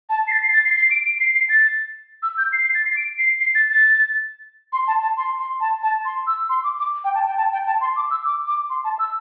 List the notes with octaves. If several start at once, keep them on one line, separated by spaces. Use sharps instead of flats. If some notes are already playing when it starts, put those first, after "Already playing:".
A5
C7
A6
C7
A6
C7
C7
D7
D7
C7
C7
A6
E6
G6
C7
C7
A6
C7
D7
C7
C7
A6
A6
C6
A5
A5
C6
C6
A5
A5
C6
E6
C6
D6
D6
G5
A5
G5
A5
G5
A5
C6
D6
E6
D6
D6
C6
A5
E6